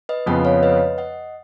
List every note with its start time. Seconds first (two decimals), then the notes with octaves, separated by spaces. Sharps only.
0.09 B4 D#5
0.26 F2 C#3 F3 B3 D#5 F#5
0.45 C#5 F5
0.63 B4 D#5
0.98 D#5 F#5